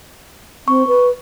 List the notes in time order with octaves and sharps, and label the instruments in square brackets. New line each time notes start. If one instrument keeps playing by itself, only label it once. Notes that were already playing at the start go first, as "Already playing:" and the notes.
[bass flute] C4 [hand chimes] C#6
[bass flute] B4